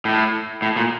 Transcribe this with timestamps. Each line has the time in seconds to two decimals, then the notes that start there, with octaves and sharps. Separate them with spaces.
0.05 A2
0.62 A2
0.76 A#2